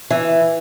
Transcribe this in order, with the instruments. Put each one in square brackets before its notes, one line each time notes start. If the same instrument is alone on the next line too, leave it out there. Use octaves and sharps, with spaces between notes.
[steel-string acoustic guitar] E3